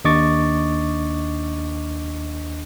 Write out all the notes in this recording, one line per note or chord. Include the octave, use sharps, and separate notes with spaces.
D#2 D4 D#5 C#6 D6 A6